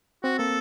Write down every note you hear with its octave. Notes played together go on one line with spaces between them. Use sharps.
C4 F#4
A#3 A4